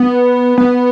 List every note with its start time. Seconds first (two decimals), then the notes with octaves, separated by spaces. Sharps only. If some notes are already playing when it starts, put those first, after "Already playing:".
Already playing: B3
0.58 B3